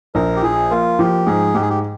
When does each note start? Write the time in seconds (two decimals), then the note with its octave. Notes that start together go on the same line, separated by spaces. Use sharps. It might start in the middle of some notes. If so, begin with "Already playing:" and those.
0.15 A#1 A#4
0.37 G4
0.43 F3 G#4
0.71 A#3 F4
0.99 F3 G4
1.26 G#2 G#4
1.54 G#2 G4
1.62 G#4
1.70 G4